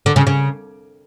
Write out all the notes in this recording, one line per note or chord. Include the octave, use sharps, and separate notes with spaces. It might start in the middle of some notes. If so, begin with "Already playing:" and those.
D3
C#3
C#3